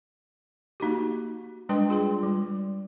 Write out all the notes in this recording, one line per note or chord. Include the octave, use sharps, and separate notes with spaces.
A#3 D#4 F#4 G4
G3 G#3 D4 B4 G5 C6
F4 G#4 G5 C6
G3